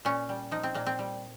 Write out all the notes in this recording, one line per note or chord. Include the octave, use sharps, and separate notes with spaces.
A#2 C#4
G3
F3 D#4
C4
A#2 A#3
C4
G3